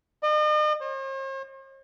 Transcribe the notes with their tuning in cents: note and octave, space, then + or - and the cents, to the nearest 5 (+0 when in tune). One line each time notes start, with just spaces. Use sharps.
D#5 -40
C5 +45